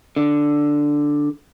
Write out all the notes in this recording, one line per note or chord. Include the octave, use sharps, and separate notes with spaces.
D3